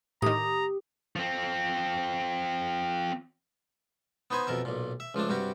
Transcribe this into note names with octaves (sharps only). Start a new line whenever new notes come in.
A2 D#3 G4 A#5 D#6
F3 C4
B3 D#4 B4 C5 G#5
F2 B2 A#4 E5
B1 A#2
E5
C#2 F3 A3 D4
G2 C3 G3 F#4 G4